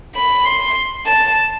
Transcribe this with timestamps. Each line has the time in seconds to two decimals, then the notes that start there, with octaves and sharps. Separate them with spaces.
0.16 B5
0.46 C6
1.06 A5